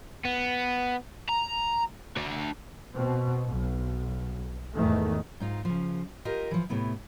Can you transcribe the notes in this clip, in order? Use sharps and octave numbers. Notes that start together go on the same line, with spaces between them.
B3
A#5
D4 F#4
B2 C4
B1
E2 G#2 D#3 E3 A3
G#2 D#4 F4
C#3 F3
F4 G4 A#4 D#5
E3 F3
A2 C3 B3 E4